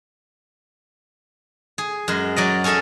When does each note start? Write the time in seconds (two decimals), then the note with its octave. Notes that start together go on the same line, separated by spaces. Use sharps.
1.78 G#4
2.08 F#2 G#3
2.36 F#3 D5 D#5
2.64 C#4 G#4 A4 D#5 E5